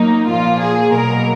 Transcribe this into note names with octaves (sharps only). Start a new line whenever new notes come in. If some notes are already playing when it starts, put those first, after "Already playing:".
Already playing: F#3 A#3 D#4
A#2 F3 A#3 F4
G#4
B2 F#3 A#3 A#4